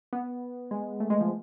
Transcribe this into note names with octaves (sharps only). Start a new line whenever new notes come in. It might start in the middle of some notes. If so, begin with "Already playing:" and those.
B3
G#3
A3
G#3
F3